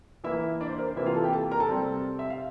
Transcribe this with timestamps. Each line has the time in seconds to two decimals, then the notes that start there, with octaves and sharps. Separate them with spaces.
0.24 E3 A#3 E4 E5
0.61 D4 D5
0.69 C5
0.79 A#4
0.88 C5
0.96 C3 E3 A#3 E4 E5
1.06 F4 F5
1.14 A4 A5
1.24 G4 G5
1.33 A4 A5
1.51 A#4 A#5
1.60 A4 A5
1.69 C3 G3 C4
2.19 E5
2.30 F5